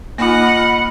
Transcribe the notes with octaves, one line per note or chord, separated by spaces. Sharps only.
A#3 D#4 F4 D#5 F#5 B5 F6